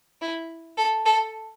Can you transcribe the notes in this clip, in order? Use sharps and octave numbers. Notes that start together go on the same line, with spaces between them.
E4
A4
A4